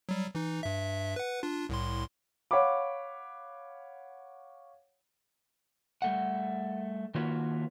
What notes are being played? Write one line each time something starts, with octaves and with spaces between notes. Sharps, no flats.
F#3 G3
E3 D#4
G2 E5
B4 F#5
D4 F4
C2 A2 C6
C#5 F5 F#5 B5 D6
G3 A3 F#5
D#3 A#3 F4 F#4 B4 C#5